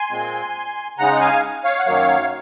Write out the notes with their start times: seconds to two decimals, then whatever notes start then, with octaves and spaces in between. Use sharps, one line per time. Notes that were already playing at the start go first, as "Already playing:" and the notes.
Already playing: G#5 C6
0.11 A#2 G#3 C4
0.98 C#3 G#3 D#4 F#5 A#5
1.15 F#5
1.21 F5 G#5
1.64 C#5 F5
1.79 F#5
1.86 F#2 D#3 F#3 A#3 C#5 F5